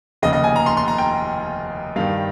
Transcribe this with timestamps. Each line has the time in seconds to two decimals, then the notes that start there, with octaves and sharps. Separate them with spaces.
0.22 F1 D#2 C#3 D#5
0.33 D#5
0.44 G#5
0.56 A#5
0.66 C6
0.77 C6
0.88 A#5
0.98 G5
1.96 G2 D#3 G3 F5